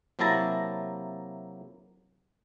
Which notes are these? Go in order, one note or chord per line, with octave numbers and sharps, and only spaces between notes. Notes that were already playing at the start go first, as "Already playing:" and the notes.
C3 F#3 A#3 E4 A5 A#5